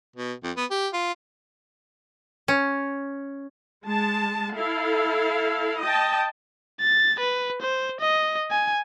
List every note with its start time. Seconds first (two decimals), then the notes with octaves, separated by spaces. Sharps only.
0.16 B2
0.43 F2
0.56 B3
0.71 G4
0.93 F4
2.48 C#4
3.85 G#3 A5
4.56 E4 A4 F5
5.81 D#5 G5 A5
6.80 A6
7.20 B4
7.62 C5
8.01 D#5
8.51 G#5